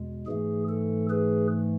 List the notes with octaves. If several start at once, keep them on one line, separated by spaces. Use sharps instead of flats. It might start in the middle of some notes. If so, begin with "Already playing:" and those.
Already playing: E2 B2 G#3
G#2 E3 A3 G#4
A4
G#4 B4